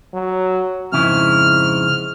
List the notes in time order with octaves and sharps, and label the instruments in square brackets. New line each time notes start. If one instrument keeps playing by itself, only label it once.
[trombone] F#3
[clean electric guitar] F2 C#3 E4 [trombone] G#2 [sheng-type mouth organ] F6